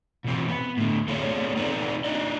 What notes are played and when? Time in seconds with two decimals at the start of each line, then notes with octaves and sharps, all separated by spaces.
0.24 B2 E3 C4
0.49 B3
0.77 A2 D3
1.08 A3 B3 C4 G#4 C#5 D5
1.56 C4 D#4 A4 B4 D5
2.04 C4 D4 D#4 D5 D#5